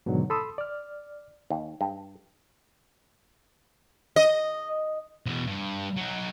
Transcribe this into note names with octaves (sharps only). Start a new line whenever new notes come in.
G#2 B2 D3 D#3 F#3
A4 B5 C6 D#6 E6
D5 F6
D#2
G2
D#5
E2 B2
G2
F#3 D#4